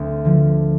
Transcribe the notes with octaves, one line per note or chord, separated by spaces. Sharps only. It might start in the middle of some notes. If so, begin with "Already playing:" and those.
Already playing: D2 C4 D4
D3 F3